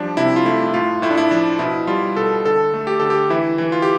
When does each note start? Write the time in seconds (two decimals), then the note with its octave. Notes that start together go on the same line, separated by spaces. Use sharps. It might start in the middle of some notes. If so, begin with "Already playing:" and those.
Already playing: F3 G3 D4
0.17 C3 E4
0.36 F4
0.45 A3 E4
0.66 E4
0.74 A2 F4
1.02 A2 E4
1.11 D4
1.17 E4
1.31 F3 D4
1.59 B2 E4
1.87 G3 F4
2.16 B2 A4
2.45 D3 A4
2.74 A3
2.87 G4
3.00 D3 A4
3.10 G4
3.30 E3 E4
3.58 E3
3.72 F4
3.82 G4